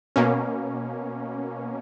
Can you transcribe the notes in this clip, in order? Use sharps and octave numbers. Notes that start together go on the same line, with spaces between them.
B2 A#3 C#4